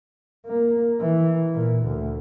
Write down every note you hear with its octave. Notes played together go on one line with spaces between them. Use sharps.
A#3
E3
A#2
D2